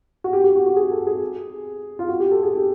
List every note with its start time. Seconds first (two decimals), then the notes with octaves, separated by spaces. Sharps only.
0.24 F#4
0.33 G4
0.44 G4
0.56 F#4
0.66 F#4
0.76 G#4
0.91 A4
1.07 G#4
1.99 F4
2.09 F#4
2.20 G4
2.31 A4
2.43 G#4
2.53 G4